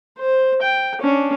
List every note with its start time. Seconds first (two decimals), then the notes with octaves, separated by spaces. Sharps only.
0.18 C5
0.62 G5
1.01 C#4 D4